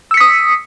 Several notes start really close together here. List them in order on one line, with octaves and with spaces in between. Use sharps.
E6 C#7 B6 D#6